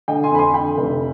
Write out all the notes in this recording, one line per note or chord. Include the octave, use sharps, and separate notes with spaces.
D3 D#5 G5
G#5 C6
F2 B5
G#5 C6
D3 G5 B5
F1